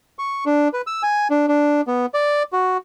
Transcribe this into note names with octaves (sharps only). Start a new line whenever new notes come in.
C#6
D4
B4
E6
G#5
D4
D4
B3
D5
F#4